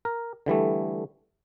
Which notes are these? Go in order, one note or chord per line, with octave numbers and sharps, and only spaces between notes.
A#4
D3 E3 G3 A3